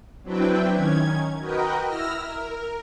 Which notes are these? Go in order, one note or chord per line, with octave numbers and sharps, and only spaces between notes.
F#3 C4 D4 E4 B4 G5
D#3 C#4 G#6
F#4 A#4 B4 D#5 G5
E4 E6 F6 A#6
A#4